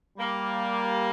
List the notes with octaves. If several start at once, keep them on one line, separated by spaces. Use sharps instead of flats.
G3 A#3